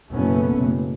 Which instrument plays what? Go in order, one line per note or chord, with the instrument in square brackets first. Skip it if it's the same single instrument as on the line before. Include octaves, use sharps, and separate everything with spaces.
[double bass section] F#1 B2 A3 B3 C#4
F#1